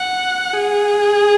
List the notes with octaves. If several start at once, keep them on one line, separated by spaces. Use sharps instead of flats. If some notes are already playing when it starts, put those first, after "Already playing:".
Already playing: F#5
G#4